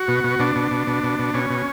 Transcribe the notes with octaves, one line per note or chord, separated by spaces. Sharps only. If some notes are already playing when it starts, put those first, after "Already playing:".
Already playing: F#4
B2
B2
B2 D4
B2
B2
B2
B2
B2
B2 C#4
B2